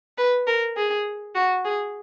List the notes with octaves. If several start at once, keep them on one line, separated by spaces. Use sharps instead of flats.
B4
A#4
G#4
F#4
G#4